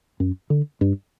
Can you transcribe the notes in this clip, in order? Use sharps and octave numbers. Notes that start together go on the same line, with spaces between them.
F#2
D3
G2